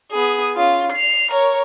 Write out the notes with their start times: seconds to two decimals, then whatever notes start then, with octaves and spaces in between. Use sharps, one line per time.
0.12 B3 G#4
0.56 C#4 F4
0.92 C7 F7
1.31 A#4 C#5